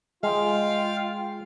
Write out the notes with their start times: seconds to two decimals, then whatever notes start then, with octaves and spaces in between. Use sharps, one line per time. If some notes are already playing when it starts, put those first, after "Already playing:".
0.23 G#3 F4 F5 G5